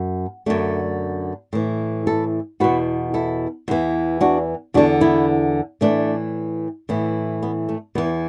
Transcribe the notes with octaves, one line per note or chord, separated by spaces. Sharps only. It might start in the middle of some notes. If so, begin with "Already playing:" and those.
Already playing: F#2
F#2 D3 A3 D4
A2 E3
E4 A4
E2 B2 F#4 B4
E4 A4
E2 E3
D4 F#4
E2 D3 D4 F#4
B3 E4
A2 E3 A3 D4
A2 E3 B3
B3
A3
E2 E3 B3